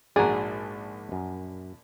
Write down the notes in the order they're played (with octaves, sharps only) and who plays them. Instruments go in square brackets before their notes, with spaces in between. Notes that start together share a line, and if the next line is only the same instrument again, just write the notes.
[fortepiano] A#1 F#4 D5 [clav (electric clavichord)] G#2 A#5 [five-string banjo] G#4
[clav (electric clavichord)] F#2